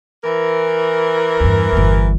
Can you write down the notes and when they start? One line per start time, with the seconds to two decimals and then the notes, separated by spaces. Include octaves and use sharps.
0.24 E3 A#4
1.40 E2 G2
1.72 G1 E2